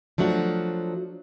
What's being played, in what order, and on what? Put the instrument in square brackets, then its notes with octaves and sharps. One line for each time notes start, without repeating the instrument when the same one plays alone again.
[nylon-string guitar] F3 F#3 A3 D4 F#4